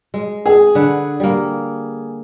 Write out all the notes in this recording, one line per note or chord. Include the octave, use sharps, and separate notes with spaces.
G#3
G#4
D3 B4 F#5
G3 A#3